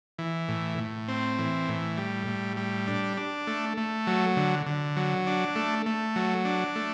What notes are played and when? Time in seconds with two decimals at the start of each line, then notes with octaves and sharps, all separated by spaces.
0.19 E3
0.48 A2
0.78 A2
1.08 C4
1.38 E3
1.68 A2
1.97 G3
2.27 A2
2.57 G3
2.88 D4
3.17 D4
3.47 A3
3.77 A3
4.07 F#3
4.37 D3
4.66 D3
4.96 F#3
5.27 D4
5.56 A3
5.86 A3
6.16 F#3
6.45 D4
6.76 A3